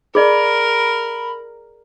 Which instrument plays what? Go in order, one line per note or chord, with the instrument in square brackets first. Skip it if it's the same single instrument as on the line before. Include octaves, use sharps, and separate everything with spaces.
[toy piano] G#4 D5 [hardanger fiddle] A#4 [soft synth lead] B5